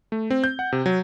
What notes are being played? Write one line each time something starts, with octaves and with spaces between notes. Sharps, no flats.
A3
C4
G6
F#5
C3
F#3